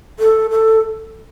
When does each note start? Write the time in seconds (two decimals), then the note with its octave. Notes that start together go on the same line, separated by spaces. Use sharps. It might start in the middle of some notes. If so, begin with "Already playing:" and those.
0.19 A4
0.51 A4